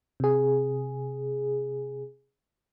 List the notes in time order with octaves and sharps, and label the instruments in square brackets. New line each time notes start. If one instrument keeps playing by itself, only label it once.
[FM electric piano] C3 G#4